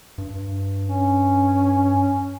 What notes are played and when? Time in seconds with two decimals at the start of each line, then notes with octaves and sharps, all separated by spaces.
0.18 G2
0.88 C#4